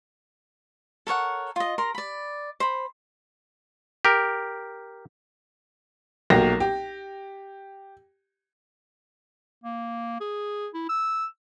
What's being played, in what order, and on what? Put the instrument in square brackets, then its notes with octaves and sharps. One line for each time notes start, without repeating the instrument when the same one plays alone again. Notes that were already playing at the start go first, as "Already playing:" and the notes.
[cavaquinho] A4 A#4 C#5 F#5
F4 D#5
A#4 A#5 C6
D5 B5
C5 B5
[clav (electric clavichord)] G4 A#4
[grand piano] B1 F#3 A#3 G4 A#6
G4
[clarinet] A#3
G#4
E4
E6